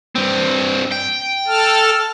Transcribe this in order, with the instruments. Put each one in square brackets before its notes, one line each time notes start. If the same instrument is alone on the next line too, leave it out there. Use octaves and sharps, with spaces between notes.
[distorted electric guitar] G2 C4
G5
[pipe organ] A4 A5 F6